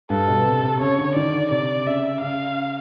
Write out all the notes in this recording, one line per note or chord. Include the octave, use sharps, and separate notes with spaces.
G2 A4
B2
C3
C3
C#3 C#5
D3
D#3 D5
D3
C3 D5
C#3 E5
C#3 F5